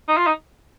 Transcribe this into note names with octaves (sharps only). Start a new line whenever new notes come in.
D#4
F4
D#4